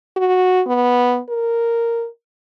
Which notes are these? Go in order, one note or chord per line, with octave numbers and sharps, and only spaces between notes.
F#4
B3
A#4